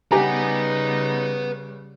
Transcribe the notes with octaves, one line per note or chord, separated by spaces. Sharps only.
C#3 G3 D#4 G4 B4 F#5 G#5 A#5